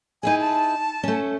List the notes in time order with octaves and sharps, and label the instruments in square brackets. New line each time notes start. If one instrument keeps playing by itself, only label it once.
[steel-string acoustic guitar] D#4 E4 G#4 [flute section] G#5
[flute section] A5
[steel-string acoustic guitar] A3 C#4